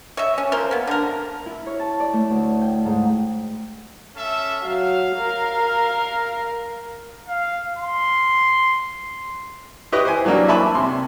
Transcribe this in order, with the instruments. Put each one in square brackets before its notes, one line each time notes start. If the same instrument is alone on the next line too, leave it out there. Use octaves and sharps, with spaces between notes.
[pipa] C#5 D#5 E5
C#4
F3 A#3 A#4 C5
A#3 B3
D3 A#4
[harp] E4
C#5
A5
D5
A3
D2
G5
G#2
[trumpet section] C#4 A4 E5
[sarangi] F#3 [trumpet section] F5
[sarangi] A#4
[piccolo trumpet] F5
C6
[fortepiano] E4 G4 B4 D#5 C#6
C5 G#5
E3 F#3 G3 A#3 D4
E5 G#5 A5 B5 C#6 D6
C3 C6